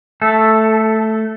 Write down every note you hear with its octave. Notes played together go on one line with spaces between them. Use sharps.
A3 A4